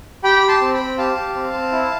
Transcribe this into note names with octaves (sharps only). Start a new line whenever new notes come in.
G4 G5 B5
G4
A5 C6
C4
G5 B5
C4
G4 F5 A5
G4
C4
C4
E4